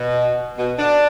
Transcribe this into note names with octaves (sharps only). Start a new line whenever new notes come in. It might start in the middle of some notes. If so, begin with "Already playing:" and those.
Already playing: B2
B2
D4